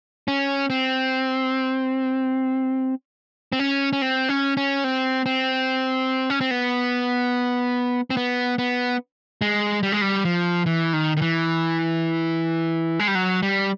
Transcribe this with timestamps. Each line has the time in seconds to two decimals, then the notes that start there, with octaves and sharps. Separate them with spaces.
0.28 C#4
0.70 C4
3.52 C4
3.60 C#4
3.93 C#4
4.02 C4
4.29 C#4
4.57 C#4
4.84 C4
5.26 C4
6.30 C#4
6.41 C4
6.51 B3
8.10 C4
8.17 B3
8.58 B3
9.42 G#3
9.83 G3
9.92 G#3
10.02 G3
10.25 F3
10.66 E3
10.93 D#3
11.17 D#3
11.22 E3
12.99 G#3
13.08 G3
13.15 F#3
13.43 G3